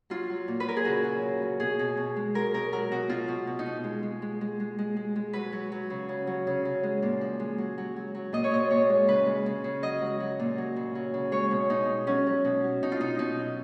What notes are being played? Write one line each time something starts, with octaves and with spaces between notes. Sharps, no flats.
F#3 F4
F#3
A#2
B4
F#3 A#4
G#4
C#3 F#4
F#3
C#3
F#3
B2 G#4
B2
B2
G#3
F#3 A#4
B2 A#4
F#3 A#4
B2 F#4
B2 F4
B2
B2
D#4
B2
G#3
G#3
G#3
G#3
G#3
G#3
G#3
G#3
F#3 B4
F#3
F#3
C#3
C#3
F#3
C#3
C#3
G#3
A#2
F3
G#3
F#3
F#3
F#3
F#3
A#2 D#5
C#5
A#2 D#5
A#2 C#5
G#3
C#3 B4
G#3
C#3
C#3
F#3 D#5
F#3
F#3
A#2
F#3
C#3
F#3
C#3
G#3 C#5
B2
B2 D#4
G#3
F#3 C#4
F#3
B2
F#3
B2 D#4
F4
B2 D#4
B2 D#4
F#3